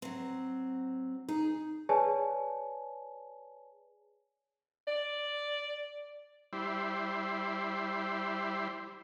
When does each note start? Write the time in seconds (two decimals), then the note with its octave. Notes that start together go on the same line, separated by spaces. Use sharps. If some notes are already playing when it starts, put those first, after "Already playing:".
0.02 F#3 C4
1.28 D#4 G#4
1.89 G#4 B4 C#5 D5 G#5 A5
4.88 D5
6.53 G3 E4 C5